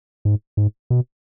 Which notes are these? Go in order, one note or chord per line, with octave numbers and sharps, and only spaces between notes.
G#2
G#2
B2